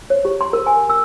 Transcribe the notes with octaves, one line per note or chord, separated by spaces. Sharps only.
C#5
G4
C6
A#4
G#5
E6